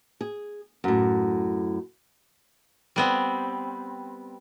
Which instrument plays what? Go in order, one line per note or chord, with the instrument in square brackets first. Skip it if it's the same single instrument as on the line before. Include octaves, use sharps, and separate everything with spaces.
[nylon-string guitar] G#4
F#2 A2
[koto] G3 B3 C4